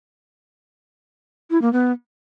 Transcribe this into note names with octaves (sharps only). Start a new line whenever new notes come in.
E4
A#3
B3